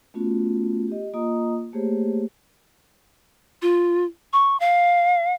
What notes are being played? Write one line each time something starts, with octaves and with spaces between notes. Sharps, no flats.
A3 B3 C#4 F4 F#4
G4 D#5
A#3 F4 D#5 A#5 D#6
A3 A#3 G4 G#4 C5 C#5
F4
C#6
F5